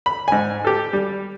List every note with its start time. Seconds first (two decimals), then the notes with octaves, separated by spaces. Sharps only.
0.06 B5
0.28 G#2 G#5
0.65 G4 A4
0.93 G3